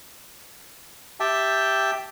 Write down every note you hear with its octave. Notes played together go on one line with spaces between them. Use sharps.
G4 E5 G5 A5